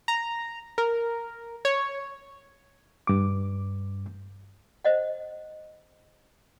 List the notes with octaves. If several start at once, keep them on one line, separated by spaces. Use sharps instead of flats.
A#5
A#4
C#5
G2 D6
C5 D#5 F#5